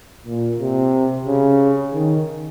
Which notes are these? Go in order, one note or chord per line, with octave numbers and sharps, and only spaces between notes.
A#2
C3
C#3
D#3